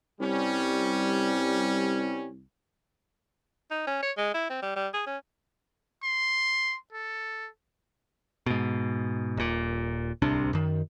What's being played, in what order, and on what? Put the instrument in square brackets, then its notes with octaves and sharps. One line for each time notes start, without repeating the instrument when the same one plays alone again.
[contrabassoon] C2 [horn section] G3 C#4
[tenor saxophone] D#4
C#4
C#5
G#3
E4
C4
G3
G3
G#4
C#4
[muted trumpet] C6
A4
[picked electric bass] G#2 B2
D#1 A#2
D1 C2 C3 D4
F#2 D#3